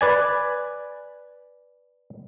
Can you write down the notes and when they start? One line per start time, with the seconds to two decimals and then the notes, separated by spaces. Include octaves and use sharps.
0.01 B4 D5 G#5